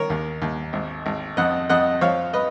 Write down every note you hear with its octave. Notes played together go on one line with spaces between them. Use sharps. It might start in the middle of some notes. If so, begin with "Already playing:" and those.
Already playing: D#3 A#4 C#5
D#2
D#2
G#1
G#1
F2 D#5 F#5
F2 D#5 F#5
F3 C#5 F5
B4 D#5